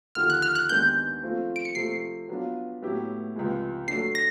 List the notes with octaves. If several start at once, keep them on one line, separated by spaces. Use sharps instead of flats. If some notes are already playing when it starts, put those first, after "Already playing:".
D#2 D3 F3 F6
F#6
F6
F#6
D#2 D#3 G#3 B3 D4 G6
F3 A3 C4 F4
D7
C#7
C3 F3 A3 C4 C7
F#3 B3 D4 F4
A2 F#3 B3 E4 G4
C#2 C3 F3 G#3
F#3 A3 D4 C7
A#6